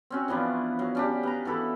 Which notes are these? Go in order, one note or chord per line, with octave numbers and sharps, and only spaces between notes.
C4 C#4 F#4
E3 F3 B3 D4
F#3
C#4 D4 G4
B3 A#5
E3 F#4 A4 B4